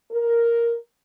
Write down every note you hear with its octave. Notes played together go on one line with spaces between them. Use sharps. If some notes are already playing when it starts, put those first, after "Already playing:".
A#4